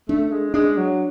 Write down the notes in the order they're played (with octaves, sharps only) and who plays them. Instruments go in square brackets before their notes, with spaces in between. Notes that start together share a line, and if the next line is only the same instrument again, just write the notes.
[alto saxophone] A3 [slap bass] D4
[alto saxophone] G#3
[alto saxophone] G#3 [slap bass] D4
[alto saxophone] F#3